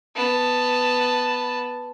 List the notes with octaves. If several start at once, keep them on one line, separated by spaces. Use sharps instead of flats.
B3 A5